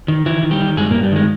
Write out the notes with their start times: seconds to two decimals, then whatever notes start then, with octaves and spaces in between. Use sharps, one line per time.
0.08 D#3
0.26 D#3 E3 E4
0.43 D#3
0.51 G3 G4
0.61 D#3
0.77 G2 G#3 G#4
0.91 G2 A#2 A#3
1.03 G3
1.12 D#3 G#3